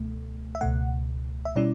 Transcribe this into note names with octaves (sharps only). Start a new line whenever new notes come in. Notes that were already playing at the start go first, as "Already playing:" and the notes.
Already playing: C#2 B2 A3
E5
C#2 B2 A3 F#5
E5
B2 G3 C#4 E4 D5